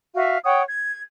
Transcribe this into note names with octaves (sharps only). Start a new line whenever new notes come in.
F#4 E5 F5
C#5 F#5 G5 D#6
G#6